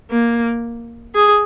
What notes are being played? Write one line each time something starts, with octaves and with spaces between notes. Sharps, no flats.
A#3
G#4